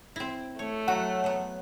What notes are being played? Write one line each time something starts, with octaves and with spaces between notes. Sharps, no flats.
C4 E4
A3 C#5
F#3 F#4 F#5
F#3 B3